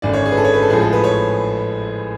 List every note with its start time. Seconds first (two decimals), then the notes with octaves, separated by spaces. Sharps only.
0.02 G#1 F#2 D3 D5
0.13 C#5
0.25 G#4
0.32 B4
0.37 A4
0.45 C#5
0.54 B4
0.62 A4
0.70 A1 A2 F3 G#3 G#4
0.81 A4
0.93 B4
1.04 C#5